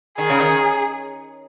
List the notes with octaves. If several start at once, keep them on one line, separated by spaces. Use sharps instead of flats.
D#3 G#4
C#3
D#3